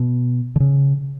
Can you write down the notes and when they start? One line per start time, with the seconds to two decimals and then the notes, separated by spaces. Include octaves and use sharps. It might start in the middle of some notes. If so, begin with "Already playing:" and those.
Already playing: B2
0.56 D3
0.60 C#3